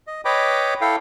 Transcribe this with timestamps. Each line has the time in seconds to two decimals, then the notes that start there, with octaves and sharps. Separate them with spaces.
0.07 D#5
0.25 B4 C#5 D#5 G5 B5 D6
0.81 E4 A4 F5 G5